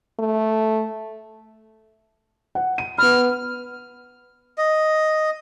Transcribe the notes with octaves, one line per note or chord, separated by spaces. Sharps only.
A3
F#5
D#7
B3 B5 F6
D#5